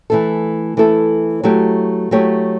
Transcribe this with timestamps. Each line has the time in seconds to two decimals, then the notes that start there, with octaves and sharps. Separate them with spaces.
0.10 E3 A3 E4 A4
0.77 E3 A3 E4 A4
1.43 F#3 A3 E4 G4 C#5
2.11 F#3 A3 E4 G4 C#5